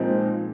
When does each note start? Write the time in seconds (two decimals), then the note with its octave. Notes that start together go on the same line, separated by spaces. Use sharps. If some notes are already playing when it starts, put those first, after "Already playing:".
Already playing: A#2 F3 G#3 C4 D#4